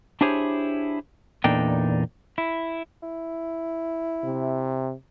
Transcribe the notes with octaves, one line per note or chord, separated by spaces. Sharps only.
D4 E4 G4 G#4 C5 C#5
E2 A#2 D4 D#4 A4 G5
E4
E4
C3